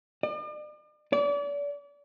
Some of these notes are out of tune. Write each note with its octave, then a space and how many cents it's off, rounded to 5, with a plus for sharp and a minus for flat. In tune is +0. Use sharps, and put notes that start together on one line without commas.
D5 +45
D5 -35